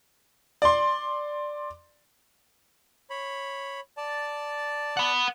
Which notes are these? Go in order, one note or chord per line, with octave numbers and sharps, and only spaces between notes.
D5 C6
C#5 B5
D5 A5
F#5 B5